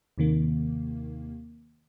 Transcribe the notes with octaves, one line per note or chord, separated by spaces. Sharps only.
D#2 C3 D#3 A#3